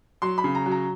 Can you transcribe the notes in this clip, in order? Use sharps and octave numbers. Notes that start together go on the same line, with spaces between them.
F#3 C6
B5
C#3
A#5
F#3
A#5